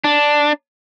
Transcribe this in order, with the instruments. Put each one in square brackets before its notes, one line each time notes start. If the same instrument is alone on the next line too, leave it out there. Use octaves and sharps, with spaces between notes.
[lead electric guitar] D4